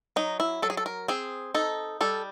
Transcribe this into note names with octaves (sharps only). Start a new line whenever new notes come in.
F#3 D#4
E4
F#3 A4
G#4
A4
A#4
C4 G#4
D#4 A4
G3 A4